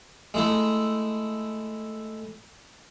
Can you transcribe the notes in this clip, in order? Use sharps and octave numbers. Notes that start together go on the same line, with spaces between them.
G#3 A3 E4